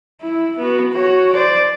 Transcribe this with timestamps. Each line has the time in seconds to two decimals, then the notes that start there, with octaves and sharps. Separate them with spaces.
0.21 E4
0.58 B3 F#4
0.93 F#4 C#5
1.33 C5 D5